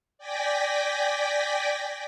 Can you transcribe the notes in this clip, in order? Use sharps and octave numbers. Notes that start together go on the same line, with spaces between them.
D5 G5 G#5 A#6 B6